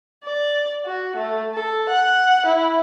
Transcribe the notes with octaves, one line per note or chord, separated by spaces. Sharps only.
D5
F#4
A3
A4
F#5
E4